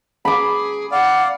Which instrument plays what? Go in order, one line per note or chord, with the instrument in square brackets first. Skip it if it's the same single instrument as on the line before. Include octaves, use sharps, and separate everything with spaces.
[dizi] G#4 [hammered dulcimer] B5 D6
[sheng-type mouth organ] D5 F5 [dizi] F#5